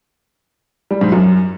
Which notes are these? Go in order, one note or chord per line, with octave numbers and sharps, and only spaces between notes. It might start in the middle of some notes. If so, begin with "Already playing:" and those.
G3
G#2
F#2